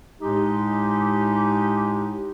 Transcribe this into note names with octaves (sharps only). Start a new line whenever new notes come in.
A2 G#3 D#4 G4